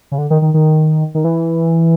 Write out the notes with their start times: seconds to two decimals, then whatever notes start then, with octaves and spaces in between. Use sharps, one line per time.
0.12 C#3
0.18 D3
0.30 D#3
0.42 D#3
0.54 D#3
1.15 D#3
1.24 E3